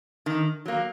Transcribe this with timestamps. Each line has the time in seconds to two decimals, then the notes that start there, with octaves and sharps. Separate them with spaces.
0.26 D#3
0.66 F#3 A#3